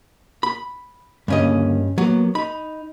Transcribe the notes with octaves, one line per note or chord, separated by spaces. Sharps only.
B5
D2 G2 C#3 A#3 C#4 D#5
F#3 A#3 B3
D#4 B5